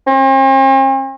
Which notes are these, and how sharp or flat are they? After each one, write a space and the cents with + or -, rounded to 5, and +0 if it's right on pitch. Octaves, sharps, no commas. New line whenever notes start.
C4 +45